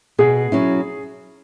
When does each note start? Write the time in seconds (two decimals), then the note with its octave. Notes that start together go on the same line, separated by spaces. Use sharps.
0.19 B2 G#4
0.52 F#3 C#4 E4